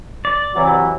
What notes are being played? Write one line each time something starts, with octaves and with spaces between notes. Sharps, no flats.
D5
C3 E3 F#3